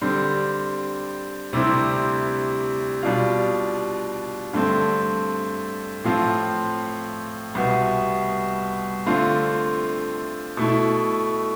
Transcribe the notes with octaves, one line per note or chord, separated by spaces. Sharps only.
D3 G3 C4
D2 C3 G3 C4 E4
B2 G3 D4 F4
G2 D3 A3 C4
A2 F3 C4 F4
C2 B2 B3
D3 A3 C4 F4
B2 A3 E4